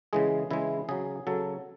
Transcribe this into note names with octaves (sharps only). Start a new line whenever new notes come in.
C#3 E3 G#3 G#4
C#3 E3 G#3 E4
C#3 F#3 G#4
C#3 F#3 A4